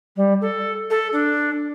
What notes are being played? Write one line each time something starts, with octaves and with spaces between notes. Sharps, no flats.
G3
A4
A4
D4